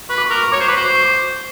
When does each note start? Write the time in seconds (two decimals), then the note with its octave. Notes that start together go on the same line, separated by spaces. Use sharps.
0.09 B4 C#6
0.18 D6
0.25 C#6
0.30 A#4 D6
0.43 C#6
0.52 C#5 D6
0.60 C5 C#6
0.68 B4 D6
0.76 C5 C#6
0.86 D6
0.94 C#6
1.02 D6
1.10 C#6